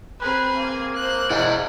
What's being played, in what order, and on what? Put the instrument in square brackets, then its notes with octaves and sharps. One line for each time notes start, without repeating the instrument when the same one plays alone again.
[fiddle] C4 G#4 [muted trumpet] B4
[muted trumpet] A#3
[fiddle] C5 F#6
[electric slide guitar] E4 G#4 D#5